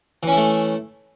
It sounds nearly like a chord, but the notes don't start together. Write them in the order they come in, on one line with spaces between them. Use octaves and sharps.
E3 C#4 E4 A3